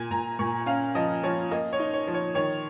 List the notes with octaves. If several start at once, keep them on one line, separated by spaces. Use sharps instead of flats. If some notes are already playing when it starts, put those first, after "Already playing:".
Already playing: A#2 G#5
A#2 A#5
A#2 C#6
C#4 F5
F3 D#5
F3 C#5
A#3 D#5
C#5
D#4
C#5
F3
C#5
D#3 C#5